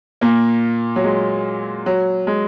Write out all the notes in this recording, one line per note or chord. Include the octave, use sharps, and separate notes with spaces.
A#2 A#3
F#3
G#3
F#3
G#3